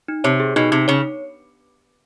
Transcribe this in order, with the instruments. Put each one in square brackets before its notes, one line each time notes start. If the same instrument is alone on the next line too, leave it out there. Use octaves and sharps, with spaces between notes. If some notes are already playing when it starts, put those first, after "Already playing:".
[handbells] D#4
[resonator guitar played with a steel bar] C3 [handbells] C#5
[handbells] G#4
[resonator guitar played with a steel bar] B2 [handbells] D#4
[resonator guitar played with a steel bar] C3 [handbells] D#4
[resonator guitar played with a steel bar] C#3 [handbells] C#5